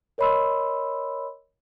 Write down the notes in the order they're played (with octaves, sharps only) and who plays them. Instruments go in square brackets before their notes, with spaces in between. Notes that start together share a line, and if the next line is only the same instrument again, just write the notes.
[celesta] A#4 C#5 D#5 B5 C6 E6